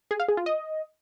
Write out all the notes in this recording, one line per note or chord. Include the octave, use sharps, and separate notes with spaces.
G#4
F5
G#4
F4
D#5